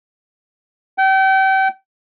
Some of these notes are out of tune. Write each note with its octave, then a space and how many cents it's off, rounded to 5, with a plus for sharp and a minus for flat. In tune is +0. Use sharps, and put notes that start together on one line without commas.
G5 -35